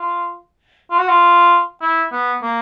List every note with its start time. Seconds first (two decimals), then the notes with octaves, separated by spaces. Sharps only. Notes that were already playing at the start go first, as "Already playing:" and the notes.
Already playing: F4
0.91 F4
0.99 F#4
1.09 F4
1.82 E4
2.12 B3
2.42 A#3